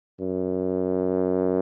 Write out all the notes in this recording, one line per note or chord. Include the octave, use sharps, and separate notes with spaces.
F#2